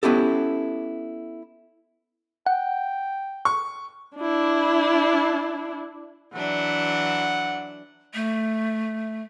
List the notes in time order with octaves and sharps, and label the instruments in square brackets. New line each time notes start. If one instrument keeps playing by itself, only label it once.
[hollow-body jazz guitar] B3 C#4 E4 G4 A4
[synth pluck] F#5 [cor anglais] G5
[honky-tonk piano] C#6
[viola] D4 E4
[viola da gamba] E3 F#3 D4 [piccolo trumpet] F#5
[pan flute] A3